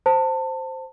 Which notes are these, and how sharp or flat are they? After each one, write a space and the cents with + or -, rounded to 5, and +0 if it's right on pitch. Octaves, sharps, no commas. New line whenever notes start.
C5 +0 A5 +25